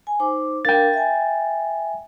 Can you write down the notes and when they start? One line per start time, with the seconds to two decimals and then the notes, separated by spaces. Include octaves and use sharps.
0.07 G#5
0.20 D#4 C5 D6
0.65 D4 A#4 F5 G5 A6
0.93 E5 G#5